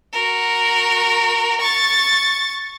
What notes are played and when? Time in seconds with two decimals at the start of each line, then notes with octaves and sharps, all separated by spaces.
0.12 F#4 A#4
1.61 C#6 A6